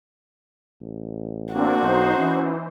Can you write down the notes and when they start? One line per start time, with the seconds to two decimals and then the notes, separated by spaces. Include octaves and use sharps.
0.81 A1
1.54 A#3 C4 D4 F#4
1.82 B1 D#4 C5
2.17 E3 C#4